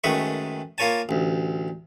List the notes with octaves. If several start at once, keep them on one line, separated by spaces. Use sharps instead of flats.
F#2 D#3 G#3 A3 B4 C#6
A#3 F4 A#4 C#5 G#5 A5
A1 D2